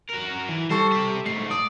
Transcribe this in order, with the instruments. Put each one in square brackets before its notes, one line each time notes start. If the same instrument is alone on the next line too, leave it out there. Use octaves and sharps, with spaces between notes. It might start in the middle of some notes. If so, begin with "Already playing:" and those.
[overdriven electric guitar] F#4 A#4
E3
[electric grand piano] G3 A4 C#6 [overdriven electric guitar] C5
[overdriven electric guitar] G4 E5
[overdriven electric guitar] G#2 A3 [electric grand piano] C7
[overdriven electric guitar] D5 [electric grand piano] D#6